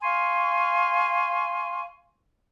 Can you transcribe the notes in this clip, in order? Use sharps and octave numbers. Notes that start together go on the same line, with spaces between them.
F5 G#5 C6 C#6